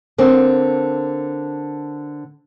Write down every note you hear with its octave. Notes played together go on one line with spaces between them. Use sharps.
D3 A#3 C4